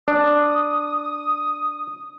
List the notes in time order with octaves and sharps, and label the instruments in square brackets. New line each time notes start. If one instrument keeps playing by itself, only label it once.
[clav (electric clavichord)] D4 [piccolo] D#6